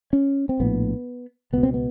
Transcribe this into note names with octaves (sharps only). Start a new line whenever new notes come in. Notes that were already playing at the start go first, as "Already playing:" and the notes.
C#4
C4
A#1 A2 B3
C#2 B2 B3
C4
B3